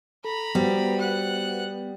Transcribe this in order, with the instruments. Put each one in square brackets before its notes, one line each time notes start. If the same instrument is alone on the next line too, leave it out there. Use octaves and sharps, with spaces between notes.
[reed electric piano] A4 [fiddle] A#5 B5
[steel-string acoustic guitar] G3 [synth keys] B3 [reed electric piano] F#4 C5
[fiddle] F#5 F#6